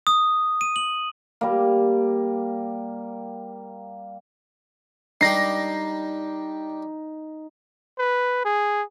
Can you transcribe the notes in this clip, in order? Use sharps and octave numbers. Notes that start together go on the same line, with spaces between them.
D#6
D#7
F#7
G3 A#3
G3 D4 D#4 G4 A#6 C7
B4
G#4